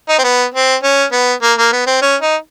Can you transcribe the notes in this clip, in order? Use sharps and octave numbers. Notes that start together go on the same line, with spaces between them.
D#4
C4
B3
C4
C#4
B3
A#3
A#3
B3
C4
C#4
D#4